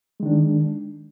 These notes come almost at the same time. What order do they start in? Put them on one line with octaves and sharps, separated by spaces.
G#3 D#3 D4